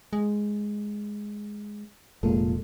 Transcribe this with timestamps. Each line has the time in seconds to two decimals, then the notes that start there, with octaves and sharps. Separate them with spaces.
0.13 G#3
2.23 F1 A#2 G#3 A#3 A4